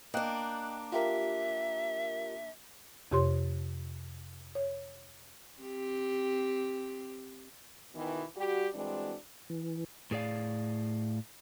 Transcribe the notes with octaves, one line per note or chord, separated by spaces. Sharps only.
A#3 D4 D#5 G5 F#6
F4 G4 A#4 E5
F2 C3 G4 C#5 C6
C#5
C4 G4
B2 D#3 E3
G3 F#4 G4
E3 G3 G#3 C4 D4 F#4
E3
A2 G#4 D5 F5